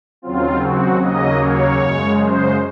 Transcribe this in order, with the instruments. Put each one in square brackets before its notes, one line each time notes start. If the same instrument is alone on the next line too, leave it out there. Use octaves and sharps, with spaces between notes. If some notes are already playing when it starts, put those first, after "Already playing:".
[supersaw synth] D#2 C#3 F#3 C4 F4
F#4
D#2 C#3 F#3 A#3 D#5
C#5
F#2 C#3 G#3
C5